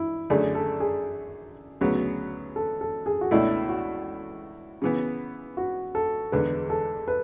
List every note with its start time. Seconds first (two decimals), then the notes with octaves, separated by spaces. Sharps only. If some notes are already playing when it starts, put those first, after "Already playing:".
Already playing: E4
0.30 F#2 D3 A3 D4 G#4
0.55 A4
0.80 G#4
1.81 D2 C#3 F#3 B3
2.56 A4
2.81 A4
3.06 G#4
3.21 F#4
3.31 C#2 B2 A3 D4 E4
3.69 F#4
4.82 C#3 E3 B3
5.57 F#4
5.95 A4
6.32 E2 D3 G#3 B4
6.70 A4
7.08 B4